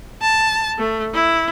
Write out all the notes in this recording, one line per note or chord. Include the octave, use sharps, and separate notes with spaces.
A5
A3
E4